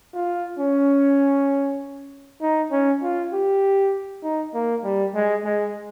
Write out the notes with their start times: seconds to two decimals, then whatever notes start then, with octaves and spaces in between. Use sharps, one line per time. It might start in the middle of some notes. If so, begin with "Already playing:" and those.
0.14 F4
0.59 C#4
2.41 D#4
2.71 C#4
3.02 F4
3.33 G4
4.23 D#4
4.54 A#3
4.84 G3
5.15 G#3
5.45 G#3